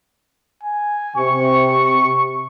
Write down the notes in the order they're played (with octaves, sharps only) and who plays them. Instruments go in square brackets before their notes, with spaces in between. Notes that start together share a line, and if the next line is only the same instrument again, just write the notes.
[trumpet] G#5
[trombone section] C3 [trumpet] C#6